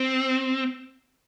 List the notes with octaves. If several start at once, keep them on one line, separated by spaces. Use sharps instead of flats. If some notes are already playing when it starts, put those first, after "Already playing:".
Already playing: C4